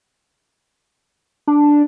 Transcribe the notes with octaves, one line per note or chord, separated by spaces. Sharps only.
D4